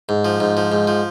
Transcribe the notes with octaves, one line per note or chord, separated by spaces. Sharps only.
G#2
F3
G#2
F3
G#2
F3